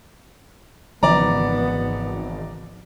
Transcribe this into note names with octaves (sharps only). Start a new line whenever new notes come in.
G#1 G#2 C#3 E3 F3 B3 D5 A#5